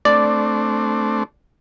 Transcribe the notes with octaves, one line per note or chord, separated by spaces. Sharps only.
A3 C4 D4 D5